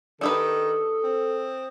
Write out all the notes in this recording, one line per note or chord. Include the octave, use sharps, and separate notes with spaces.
D#3 D4 G4 A4 B4 D#6 E6 C#7
C4